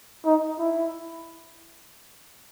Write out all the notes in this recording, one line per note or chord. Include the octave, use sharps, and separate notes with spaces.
D#4
E4